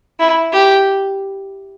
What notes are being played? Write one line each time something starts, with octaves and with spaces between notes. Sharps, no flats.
E4
G4